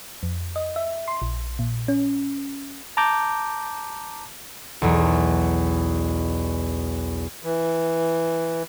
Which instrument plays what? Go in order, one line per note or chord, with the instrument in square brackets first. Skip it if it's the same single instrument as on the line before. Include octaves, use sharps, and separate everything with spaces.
[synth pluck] F2
D#5
E5
C6
A#1
A#2
C#4
[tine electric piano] A5 A#5 D6 G6
[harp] B1 E2
[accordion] E3